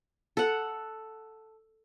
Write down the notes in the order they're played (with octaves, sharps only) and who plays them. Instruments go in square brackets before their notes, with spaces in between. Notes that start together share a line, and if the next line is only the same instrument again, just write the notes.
[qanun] A4 F#5